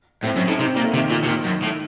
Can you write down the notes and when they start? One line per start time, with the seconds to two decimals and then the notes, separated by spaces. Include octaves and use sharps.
0.24 A2 C4
0.36 F#2 C#4
0.47 A2 D#4
0.59 C3 D#4
0.67 C4
0.76 A#2 A#3
0.84 A3
0.93 C3 D#3
1.10 A#2 F3
1.24 C3
1.27 A#2 D#3
1.45 F#2
1.63 A2